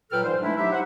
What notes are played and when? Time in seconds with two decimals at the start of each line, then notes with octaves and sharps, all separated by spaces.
0.12 A#2 F#3 A4 B4 G5 F6
0.24 G#2 E3 G3 C5
0.41 G#3 A3 D4 E4
0.57 F#3 D#4 E4 G4 E5
0.72 C5 F#5